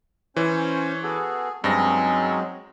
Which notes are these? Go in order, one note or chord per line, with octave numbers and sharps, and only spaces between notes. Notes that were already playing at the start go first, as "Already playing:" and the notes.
E3 C#4 C5 C#5
B3 F#4 G#4 A4
G2 F#3 G#3 C4 C#4 D#4 G#4 A#6